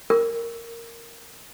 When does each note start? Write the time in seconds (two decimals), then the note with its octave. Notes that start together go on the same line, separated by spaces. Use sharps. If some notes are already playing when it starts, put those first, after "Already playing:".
0.10 A#4